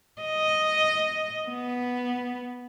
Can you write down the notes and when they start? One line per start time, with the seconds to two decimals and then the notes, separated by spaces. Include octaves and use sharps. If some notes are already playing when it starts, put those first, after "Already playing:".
0.22 D#5
1.49 B3